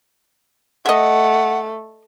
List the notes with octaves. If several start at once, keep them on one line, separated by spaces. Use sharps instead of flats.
A3 D#5 E5 F#5